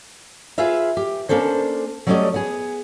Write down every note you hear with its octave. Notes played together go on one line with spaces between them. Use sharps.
F4 G#4 B4 E5 F5
G4
A#3 C#4 D4 A4 C5
F#3 G3 A3 C#4 D5 D#5
B3 G#4